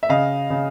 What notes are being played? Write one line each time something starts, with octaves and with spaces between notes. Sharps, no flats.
E5
C#3 D#5 F5
C#3